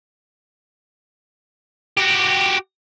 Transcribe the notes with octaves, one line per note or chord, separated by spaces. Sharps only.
F#4 G4